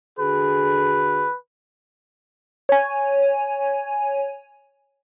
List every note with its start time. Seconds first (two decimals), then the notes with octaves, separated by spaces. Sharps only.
0.19 D3 F#4 G#4 B4
2.69 C#5 G#5